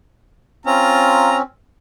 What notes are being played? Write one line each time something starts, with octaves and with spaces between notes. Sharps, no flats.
C4 C#4 F4 A#5